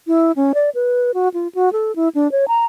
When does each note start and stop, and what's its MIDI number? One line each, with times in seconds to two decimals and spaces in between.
0.07 0.32 64
0.36 0.52 61
0.54 0.70 74
0.75 1.11 71
1.14 1.29 66
1.34 1.48 65
1.55 1.72 66
1.73 1.95 69
1.96 2.09 64
2.15 2.30 62
2.32 2.45 73
2.48 2.66 82